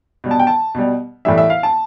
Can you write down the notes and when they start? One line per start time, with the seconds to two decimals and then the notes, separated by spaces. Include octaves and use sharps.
0.24 B2 G3
0.31 A5
0.39 G5
0.47 A5
0.75 B2 G3
1.25 A2 E3 G3 E5
1.38 E5
1.50 F5
1.63 A5